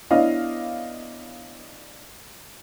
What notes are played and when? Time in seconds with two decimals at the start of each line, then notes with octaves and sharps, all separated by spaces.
0.11 B3 D4 E4 C#5 D#5 F5